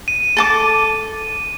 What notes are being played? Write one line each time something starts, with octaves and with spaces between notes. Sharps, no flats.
D#7
A4 A5 D6